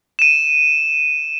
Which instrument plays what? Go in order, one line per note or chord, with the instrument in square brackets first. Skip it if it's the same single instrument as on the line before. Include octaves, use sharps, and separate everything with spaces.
[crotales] D#7 E7